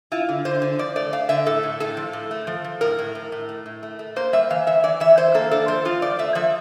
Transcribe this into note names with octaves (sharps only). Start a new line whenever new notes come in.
E4 F4
D3
D3 C5
D3
F3 D5
A3 D5
A3 F5
D3 E5
A2 A4
A2
A2 A4
F3
A2
A3
F3
F3
A2 A#4
A2
A2
A2
A3
A2
A3
A3
A#3 C5
G3 E5
E3 F5
E3 E5
E3 D5
E3 E5
E3 C5
A#3 A4
D4 A4
F3 C5
F3 F4
A3 D5
A3 E5
F3 E5